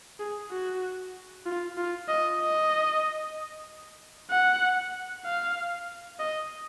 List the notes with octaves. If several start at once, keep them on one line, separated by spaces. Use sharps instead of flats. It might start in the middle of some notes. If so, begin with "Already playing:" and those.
G#4
F#4
F4
F4
D#5
D#5
F#5
F5
D#5